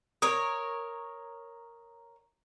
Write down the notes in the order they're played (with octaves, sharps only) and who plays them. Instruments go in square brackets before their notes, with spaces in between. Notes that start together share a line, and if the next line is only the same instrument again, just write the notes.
[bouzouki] A#4 C#5 [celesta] D#6